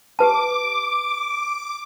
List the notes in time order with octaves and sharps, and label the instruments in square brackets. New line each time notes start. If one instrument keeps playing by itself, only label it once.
[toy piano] G4 B4 A5 [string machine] D6